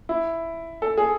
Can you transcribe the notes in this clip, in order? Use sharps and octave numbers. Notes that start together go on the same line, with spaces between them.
E4
A4
G#4